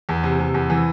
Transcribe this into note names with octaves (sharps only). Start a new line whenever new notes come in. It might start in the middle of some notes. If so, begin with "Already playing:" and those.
E2
C3
C3
E2
E3